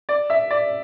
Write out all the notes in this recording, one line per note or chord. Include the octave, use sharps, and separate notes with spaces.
D5
E5
D5